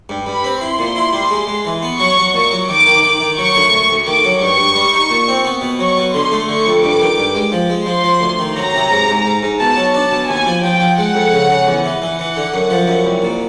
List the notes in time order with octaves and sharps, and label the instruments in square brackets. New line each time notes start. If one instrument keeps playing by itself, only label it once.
[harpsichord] G2
[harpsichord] G2 [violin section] B5
[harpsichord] C4
[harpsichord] E4 [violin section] C6
[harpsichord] A#2
E4
G3
G#3
G#3
E3
B3
[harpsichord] F#3 [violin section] C#6
[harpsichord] F#3
[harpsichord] A#2 [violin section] C#6
[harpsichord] F#3
[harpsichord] D#3 [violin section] D6
[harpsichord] D#3
D#3
D#3
[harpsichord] F#3 [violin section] C#6
[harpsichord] D2
D2
D2
[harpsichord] D#3 [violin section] D6
[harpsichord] F#3
[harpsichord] G2 [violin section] C#6
[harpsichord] G2
G3
D#4
A#2
C4
B3
B2
[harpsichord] F#3 [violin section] C#6
[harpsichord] B2
[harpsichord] D3 [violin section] C6
[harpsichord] A3
[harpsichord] D3 [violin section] C#6
[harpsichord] F2
[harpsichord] G2 [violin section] D6
[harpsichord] D#3
G2
G#3
F3
G#3
[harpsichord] F3 [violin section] C6
[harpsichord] F3
D2
D#3
[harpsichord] F#3 [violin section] A#5
[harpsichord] C3
G#2
G#2
G#2
G#2
[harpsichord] B2 [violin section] A5
[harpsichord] F#3
[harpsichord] D4 [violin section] A5
[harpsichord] B2
[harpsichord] D#2 [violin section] G#5
[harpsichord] F3
[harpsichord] F3 [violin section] G5
[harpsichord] F3
[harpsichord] G#3 [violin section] F#5
[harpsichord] F2
C#3
C#3
E2
E3
[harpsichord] E3 [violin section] F#5
[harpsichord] E3
D3
F#2
F3
F#2
C2
A#2